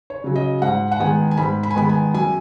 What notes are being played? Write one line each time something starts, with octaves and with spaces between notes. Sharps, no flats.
C#5
C#3 F#3
D#5
G#2 F#5
F#5
D#3 G#3 B3 G#5
G#5
G#2 B5
B5
G#5
D#3 G#3 B3 B5
G#5
F#2 G#5